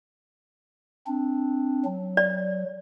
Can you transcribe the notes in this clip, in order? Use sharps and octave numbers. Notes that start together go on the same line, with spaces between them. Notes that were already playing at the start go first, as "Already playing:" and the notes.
C4 D4
F#3
D5